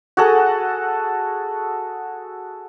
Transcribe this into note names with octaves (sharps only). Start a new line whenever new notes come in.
F#4 G#4 A4 F#5